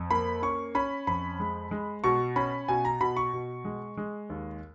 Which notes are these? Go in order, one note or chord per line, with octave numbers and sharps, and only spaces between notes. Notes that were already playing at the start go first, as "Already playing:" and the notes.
Already playing: F2
A#3 B5
C#4 C#6
C#4 B5
F2 B5
G#3
G#3
B2 C#6
C#4 B5
B2 G#5
A#5
B2 B5
C#6
B2
G#3
G#3
D#2